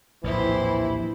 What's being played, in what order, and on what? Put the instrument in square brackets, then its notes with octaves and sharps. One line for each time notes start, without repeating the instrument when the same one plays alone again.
[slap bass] A#1 D#2 [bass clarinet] A2 [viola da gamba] C3 E4 C5 [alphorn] E3